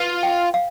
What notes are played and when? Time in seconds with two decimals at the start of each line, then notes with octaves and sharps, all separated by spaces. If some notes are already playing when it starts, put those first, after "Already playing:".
Already playing: F4 B4
0.23 G5
0.54 F5